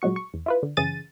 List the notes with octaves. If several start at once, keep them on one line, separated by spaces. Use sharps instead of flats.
A#2 F#3 G#3 F#4 C#6
C#6
E2
E4 F4 B4
D3
F#2 C#3 E3 G#4 A6 D#7